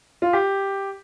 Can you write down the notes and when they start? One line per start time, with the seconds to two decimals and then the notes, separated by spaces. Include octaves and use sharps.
0.22 F4
0.33 G4